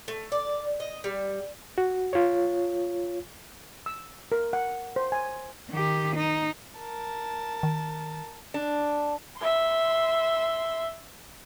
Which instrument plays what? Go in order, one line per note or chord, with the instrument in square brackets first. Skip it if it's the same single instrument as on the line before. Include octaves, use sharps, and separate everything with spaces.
[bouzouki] A3
D5
D#5
G3
[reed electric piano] F#4
F4 C#5
[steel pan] E6
A#4
F#5
C5
G#5
[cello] D#3 G4
D#4
[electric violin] A#4 A5
[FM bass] D#3
[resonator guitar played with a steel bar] D4
[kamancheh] E5 C6